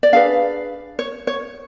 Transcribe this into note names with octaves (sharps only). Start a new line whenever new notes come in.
D5
D4 G#4 B4 F5
C#5
C#5